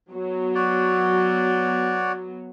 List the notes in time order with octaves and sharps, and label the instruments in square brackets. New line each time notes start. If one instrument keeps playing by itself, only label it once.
[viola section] F#3 B3
[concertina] F#4 C#5 D5